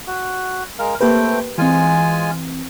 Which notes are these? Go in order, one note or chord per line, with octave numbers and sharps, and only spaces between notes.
F#4
G#3 A#4 F5
A3 A#3 C4 G4 B4 G5
E3 G#3 C4 F4 G#5